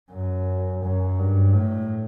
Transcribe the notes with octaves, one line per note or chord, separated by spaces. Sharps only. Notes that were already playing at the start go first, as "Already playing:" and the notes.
F#2
F#2
G2
A2